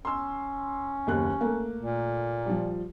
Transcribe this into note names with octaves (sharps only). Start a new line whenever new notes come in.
C#4 C6 E6
F#1 D#2 F#6
A3 A#3
A#2
F3 G3